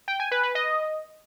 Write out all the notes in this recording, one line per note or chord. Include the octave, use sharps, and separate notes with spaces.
G5
G#5
B4
B4
D#5